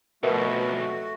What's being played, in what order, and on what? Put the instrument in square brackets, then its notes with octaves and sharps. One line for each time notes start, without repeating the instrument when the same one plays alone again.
[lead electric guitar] B1 F2 [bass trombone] B2 [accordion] A3 F#4 [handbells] A#4 B4 E5